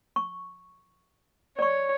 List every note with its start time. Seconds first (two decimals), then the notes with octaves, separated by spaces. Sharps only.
0.16 C#6
1.59 C#5 D5 C#6